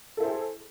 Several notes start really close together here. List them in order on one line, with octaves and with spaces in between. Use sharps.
A4 E4 C5 G#4